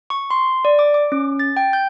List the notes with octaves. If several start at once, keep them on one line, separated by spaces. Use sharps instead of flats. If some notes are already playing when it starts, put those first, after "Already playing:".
C#6
C6
D5
D6
D6
C#4
A6
G5
G6